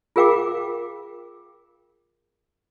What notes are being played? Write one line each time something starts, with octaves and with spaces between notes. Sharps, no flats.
F4 G#4 A#4 F5 G5 D6